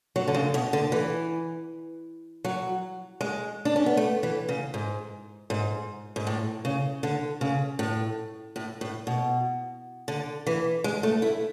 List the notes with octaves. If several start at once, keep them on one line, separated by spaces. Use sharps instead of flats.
F#3
D3
C#3
B2
D3
E3
F#3
G#3
D4
C#4
B3
A3
E3
C#3
G#2
G#2
G#2
A2
C#3
D3
C#3
A2
A2
A2
B2
D3
E3
G#3
A3
E4